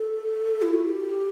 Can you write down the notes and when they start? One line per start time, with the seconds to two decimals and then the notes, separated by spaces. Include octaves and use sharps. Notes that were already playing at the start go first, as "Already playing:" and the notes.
Already playing: A4
0.62 E4
0.74 F#4
0.85 G4